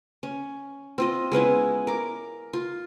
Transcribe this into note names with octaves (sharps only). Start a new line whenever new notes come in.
C#4
C4 F4 D#5
G#3 B3 C#4 E4
A#4 D6
F4